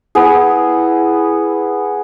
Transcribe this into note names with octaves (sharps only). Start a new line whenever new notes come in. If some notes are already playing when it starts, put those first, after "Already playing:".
B3 E4 G#4